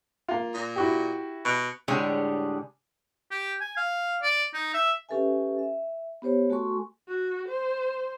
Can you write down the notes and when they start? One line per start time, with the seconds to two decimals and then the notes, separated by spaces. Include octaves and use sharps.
0.28 A#3 F4
0.54 A#2
0.76 E4 F#4 G4
1.45 B2
1.88 A2 D3 G3 G#3 G#4 C#5
3.31 G4
3.61 G#5
3.77 F5
4.22 D5
4.54 D#4
4.74 E5
5.09 C#4 G4 A4 B4 E5 G#5
5.59 E5
6.22 B3 G4 C5 C#5
6.50 A3 F#4 A4 G#5 C6 C#6
7.09 F#4
7.49 C5